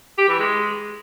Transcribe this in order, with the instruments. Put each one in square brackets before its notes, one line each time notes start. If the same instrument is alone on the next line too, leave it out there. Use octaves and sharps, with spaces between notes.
[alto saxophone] G4
E3
G#3